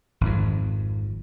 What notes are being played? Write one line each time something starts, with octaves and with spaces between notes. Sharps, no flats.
G#1 F2